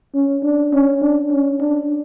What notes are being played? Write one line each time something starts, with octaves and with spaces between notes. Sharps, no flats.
C#4
D4
C#4
D4
C#4
D4